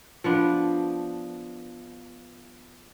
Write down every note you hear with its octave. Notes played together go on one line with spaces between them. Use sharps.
F3 B3 D4